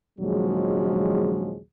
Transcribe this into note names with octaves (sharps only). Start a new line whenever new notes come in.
A#1 D#2 C#3 F3 F#3 G#3